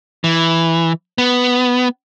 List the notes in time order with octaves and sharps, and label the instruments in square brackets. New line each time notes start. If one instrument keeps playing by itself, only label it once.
[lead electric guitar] E3
B3